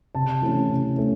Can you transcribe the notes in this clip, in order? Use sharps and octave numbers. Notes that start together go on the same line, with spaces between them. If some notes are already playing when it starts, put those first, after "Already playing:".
C3 A5
E3 A3 C#4
C3
A3 C#4